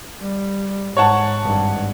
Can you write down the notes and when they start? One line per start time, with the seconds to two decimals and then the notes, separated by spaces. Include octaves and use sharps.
0.22 G3
0.97 G#2 C#5 F#5 A5
1.43 G#1 G2